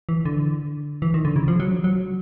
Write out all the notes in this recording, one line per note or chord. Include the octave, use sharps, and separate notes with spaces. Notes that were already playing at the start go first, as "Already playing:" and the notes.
E3
D3
E3
D#3
D3
C#3
F3
F#3
F#3